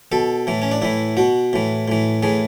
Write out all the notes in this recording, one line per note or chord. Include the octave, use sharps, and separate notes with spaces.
B2 A4
A2 E3
C#4
D4
A2 E3 E4
B2 F#4
A2 E3
A2 E3
A2 E3 G#4